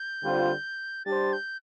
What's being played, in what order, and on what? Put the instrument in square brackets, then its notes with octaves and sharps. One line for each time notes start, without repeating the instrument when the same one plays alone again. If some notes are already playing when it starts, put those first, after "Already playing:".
Already playing: [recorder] G6
[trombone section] D3 G3 C4 F4 C5
[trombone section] G3 D4 G4 C5 [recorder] A6
[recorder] G6